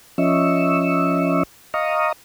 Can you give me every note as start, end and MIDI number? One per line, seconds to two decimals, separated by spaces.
0.18 1.43 53
0.18 1.43 61
0.18 1.43 75
0.18 1.43 76
0.18 1.43 85
0.18 1.43 88
1.74 2.13 75
1.74 2.13 77
1.74 2.13 82
1.74 2.13 85
1.74 2.13 87